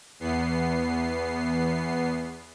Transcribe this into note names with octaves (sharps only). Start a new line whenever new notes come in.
E2 B3 C7